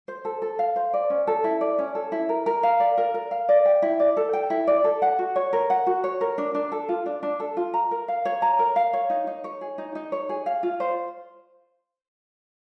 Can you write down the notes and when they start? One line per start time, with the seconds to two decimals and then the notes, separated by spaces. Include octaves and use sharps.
0.08 C5
0.25 A4
0.42 A4
0.59 F5
0.76 C5
0.94 D5
1.10 C#4
1.27 A4
1.44 E4
1.61 D5
1.78 C#4
1.95 A4
2.12 E4
2.29 A#4
2.46 A#4
2.63 F5
2.80 D5
2.98 A#4
3.14 A#4
3.31 F5
3.49 D5
3.65 G5
3.82 E4
4.00 D5
4.17 A4
4.33 G5
4.50 E4
4.67 D5
4.84 A4
5.02 F#5
5.19 F#4
5.36 C#5
5.53 A#4
5.70 F#5
5.87 F#4
6.04 C#5
6.21 A#4
6.38 D4
6.55 D4
6.72 A4
6.89 F4
7.06 D4
7.23 D4
7.40 A4
7.57 F4
7.74 A#5
7.91 A#4
8.08 F5
8.25 C#5
8.42 A#5
8.59 A#4
8.76 F5
8.93 C#5
9.10 D#4
9.27 D#4
9.44 C#5
9.61 G#4
9.78 D#4
9.95 D#4
10.12 C#5
10.29 G#4
10.46 F5
10.63 F4
10.80 C5